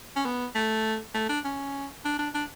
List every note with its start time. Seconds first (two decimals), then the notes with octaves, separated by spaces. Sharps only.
0.16 C#4
0.25 B3
0.55 A3
1.15 A3
1.29 D4
1.45 C#4
2.05 D4
2.19 D4
2.34 D4